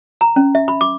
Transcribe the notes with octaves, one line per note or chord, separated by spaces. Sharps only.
A#5
C#4
E5
B5
D6